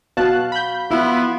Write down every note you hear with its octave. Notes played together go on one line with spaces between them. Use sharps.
B2 F#4 F5 A5 F#6
B5 G6
B3 E4 F4